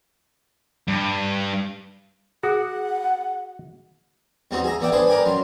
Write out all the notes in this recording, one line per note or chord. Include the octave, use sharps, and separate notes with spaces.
G2
F#4 G#4 F#5 D#6
E2 G3 C4 D#4 F#4
G#4 E5 A#5
E3 B3 D5 E5 G5
D4 G#4 B4 C5 G#5
A#4 B4 D5 G5 G#5
F#2 F#3 C6